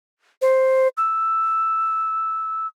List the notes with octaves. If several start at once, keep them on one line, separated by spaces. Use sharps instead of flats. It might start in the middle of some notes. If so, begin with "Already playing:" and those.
C5
E6